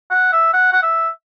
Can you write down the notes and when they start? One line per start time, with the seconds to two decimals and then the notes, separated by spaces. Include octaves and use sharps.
0.11 F#5
0.32 E5
0.53 F#5
0.73 F#5
0.83 E5